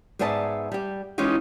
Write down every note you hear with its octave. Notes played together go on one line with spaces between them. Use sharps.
G#2 B3 G#4 D5 E5 A5
G3 G4
E3 G#3 C#4 D#4 F4 G4